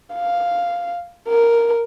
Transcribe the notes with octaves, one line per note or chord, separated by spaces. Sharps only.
F5
A#4